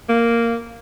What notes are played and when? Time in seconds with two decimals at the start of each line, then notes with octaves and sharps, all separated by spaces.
0.09 A#3